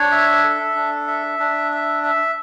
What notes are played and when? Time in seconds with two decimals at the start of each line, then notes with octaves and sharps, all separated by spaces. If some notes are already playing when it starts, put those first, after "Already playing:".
Already playing: D4 C#5
0.11 E5
0.44 A4
0.75 D4
1.07 E5
1.39 D4
1.72 E5
2.03 E5